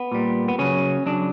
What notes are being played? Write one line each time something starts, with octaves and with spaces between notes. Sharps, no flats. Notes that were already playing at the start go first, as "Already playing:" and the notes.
Already playing: B3
A#2 G3
B3
C#3 F#3 C#4
C#3 F#3 D4